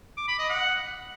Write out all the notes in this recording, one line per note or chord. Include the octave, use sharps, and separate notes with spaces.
D6
B5
D#5
F#5